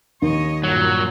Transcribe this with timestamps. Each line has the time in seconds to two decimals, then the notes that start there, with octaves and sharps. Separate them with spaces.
0.22 D#2 C#5 D#5
0.64 G2 A#2 F#3